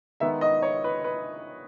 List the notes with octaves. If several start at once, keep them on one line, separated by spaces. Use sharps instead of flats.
D#3 G#3 B3 E5
D#5
C#5
B4
B4